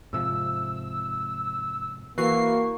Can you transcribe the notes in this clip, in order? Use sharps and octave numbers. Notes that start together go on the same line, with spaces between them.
G#2 C3 F3 E6
E3 A#3 F#4 C#6 C7